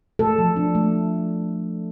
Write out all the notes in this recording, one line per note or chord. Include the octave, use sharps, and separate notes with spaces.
A3 A4
F3
D4
A3